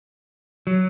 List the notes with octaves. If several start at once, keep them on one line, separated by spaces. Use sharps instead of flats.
F#3